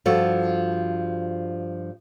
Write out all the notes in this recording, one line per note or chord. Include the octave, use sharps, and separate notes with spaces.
G2 F3 F#4 A4